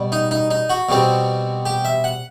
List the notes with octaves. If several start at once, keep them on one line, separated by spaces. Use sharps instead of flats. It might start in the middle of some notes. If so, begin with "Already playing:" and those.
Already playing: B2 G3
D#4
D#4
D#4
F#4
B2 G3 C4
G4
E5
F#5